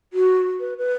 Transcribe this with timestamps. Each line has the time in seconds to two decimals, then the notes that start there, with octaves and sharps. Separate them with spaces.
0.13 F#4
0.60 B4
0.78 B4